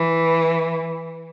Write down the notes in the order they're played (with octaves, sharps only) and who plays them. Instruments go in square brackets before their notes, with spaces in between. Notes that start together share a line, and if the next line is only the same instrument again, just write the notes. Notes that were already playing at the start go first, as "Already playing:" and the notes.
Already playing: [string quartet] E3